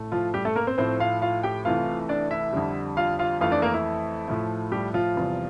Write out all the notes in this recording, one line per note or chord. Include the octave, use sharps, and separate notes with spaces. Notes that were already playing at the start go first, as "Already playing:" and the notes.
Already playing: A2 A3
F3 F4
G3 G4
A3 A4
A#3 A#4
C4 C5
A2 F3 A3 C4 C5
F4 F5
F4 F5
G4 G5
C2 C3 E3 A3 F4 F5
D4 D5
E4 E5
F2 D3 G3
F4 F5
F4 F5
F2 E3 A3 F4 F5
D4 D5
A#3 A#4
E4
A2 F3 A3
G3 G4
F3 F4
E2 C3 G3